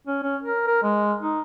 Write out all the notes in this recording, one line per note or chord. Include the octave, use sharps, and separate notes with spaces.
C#4
C#4
A#4
A#4
G#3
D#4